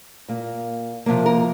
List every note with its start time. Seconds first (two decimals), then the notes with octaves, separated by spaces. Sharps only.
0.29 A#2 A#3
1.06 C3 F3 A#3
1.26 A#4